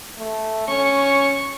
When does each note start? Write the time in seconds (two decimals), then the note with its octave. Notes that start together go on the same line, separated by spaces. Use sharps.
0.18 A3
0.68 C#4 C#6